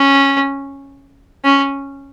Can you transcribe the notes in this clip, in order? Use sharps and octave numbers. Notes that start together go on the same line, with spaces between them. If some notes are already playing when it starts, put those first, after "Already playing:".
Already playing: C#4
C#4